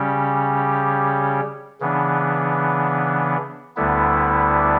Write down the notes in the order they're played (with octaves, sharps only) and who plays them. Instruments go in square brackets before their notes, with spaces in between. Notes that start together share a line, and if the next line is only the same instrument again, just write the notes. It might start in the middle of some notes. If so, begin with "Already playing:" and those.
Already playing: [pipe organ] C#3 G3 C#4 G4
C#3 E3 B3 D4
D2 D3 G3 B3 E4